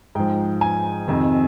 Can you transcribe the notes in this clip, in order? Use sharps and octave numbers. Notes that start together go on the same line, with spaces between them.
G#2 F3 G5
G#5
F2 C3 D#3